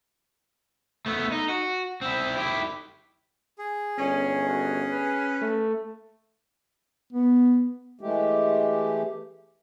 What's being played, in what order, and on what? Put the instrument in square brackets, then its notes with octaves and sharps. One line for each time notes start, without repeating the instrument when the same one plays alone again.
[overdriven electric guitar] A3 B3
D#4
F#4
C4 E4
E4 G4
[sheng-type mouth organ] G#4
[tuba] G1 [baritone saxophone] C#4 [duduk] C#5
[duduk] F#4
B4
[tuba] A3
[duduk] B3
[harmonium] E3 G#3 A3 G4